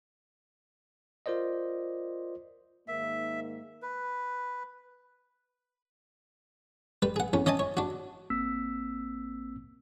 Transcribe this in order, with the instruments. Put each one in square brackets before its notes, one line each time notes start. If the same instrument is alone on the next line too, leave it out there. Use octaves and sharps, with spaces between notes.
[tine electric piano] F4 A#4 C5 D5 D#5
[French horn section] G#2 D#3 A#3 [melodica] E5
[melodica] B4
[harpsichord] G3 B4
G#4 F#5
E2 C#4
C#4 D#5 G#5 A5 D#6
C#5
D4 F#4
[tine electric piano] A1 A#3 C4 E6 B6